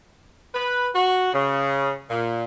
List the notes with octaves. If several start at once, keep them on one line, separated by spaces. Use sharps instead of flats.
B4
F#4
C#3
A#2